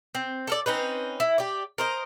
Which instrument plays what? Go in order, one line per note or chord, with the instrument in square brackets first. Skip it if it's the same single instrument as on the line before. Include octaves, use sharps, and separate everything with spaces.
[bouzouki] C4
A4 A#4 D5
C4 C#4 D#4 B4
E4
G4 D5
A#4 C5 D#5